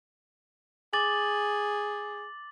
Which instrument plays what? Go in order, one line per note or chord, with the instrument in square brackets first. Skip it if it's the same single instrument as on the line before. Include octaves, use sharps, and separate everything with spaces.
[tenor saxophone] G#4 [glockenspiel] D6 A6 F#7